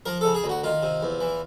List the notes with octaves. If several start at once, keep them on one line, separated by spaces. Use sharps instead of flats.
F3 A#4
C#3 A4
G#4
D2
F#4
D#3 F4
C3
E2
E3